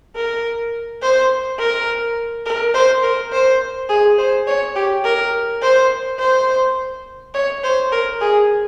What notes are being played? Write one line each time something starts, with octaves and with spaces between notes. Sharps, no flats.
A#4
C5
A#4
A#4
C5
A#4
C5
G#4
C5
C#5
G4
A#4
C5
C5
C#5
C5
A#4
G#4